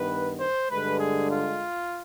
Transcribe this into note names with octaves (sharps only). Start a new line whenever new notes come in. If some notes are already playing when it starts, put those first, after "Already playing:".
Already playing: G2 D#3 B3 B4
C5
G2 D3 G#3 B4
G#4
F4